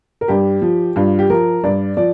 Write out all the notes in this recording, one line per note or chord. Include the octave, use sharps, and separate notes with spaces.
A#4
G2 G4
F3
G2 F4
G4
F3 A#4
G2 D5
F3 D5